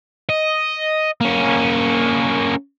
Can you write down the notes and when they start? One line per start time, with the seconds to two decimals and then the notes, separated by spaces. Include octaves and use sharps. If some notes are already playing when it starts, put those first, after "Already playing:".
0.29 D#5
1.21 A#3 C#4